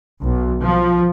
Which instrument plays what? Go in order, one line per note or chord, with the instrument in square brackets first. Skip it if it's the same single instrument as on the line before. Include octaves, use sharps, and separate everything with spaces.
[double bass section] B1
F3